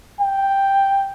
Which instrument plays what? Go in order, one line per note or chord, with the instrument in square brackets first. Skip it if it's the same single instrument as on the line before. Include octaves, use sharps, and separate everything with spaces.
[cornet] G5